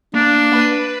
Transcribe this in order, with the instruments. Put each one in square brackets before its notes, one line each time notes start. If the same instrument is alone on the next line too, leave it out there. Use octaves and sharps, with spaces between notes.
[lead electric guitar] A#3 [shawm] D4
[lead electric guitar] B4 B5